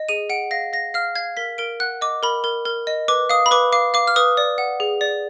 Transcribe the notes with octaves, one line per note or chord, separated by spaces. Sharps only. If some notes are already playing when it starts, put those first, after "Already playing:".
Already playing: D#5
G#4 D#7
F#5 D7
F5 A#6
F5 A#6
F5 F6
F5 G#6
A#4 B6
A#4 D7
F#5 F#6
D#5 D6
A#4 B5
A#4
A#4
D#5
B4 D6
F5 D#6
B5
B4 D6
F5 D6
F5 D6
F6
B4 D#6
D5
F#5
G#4
D5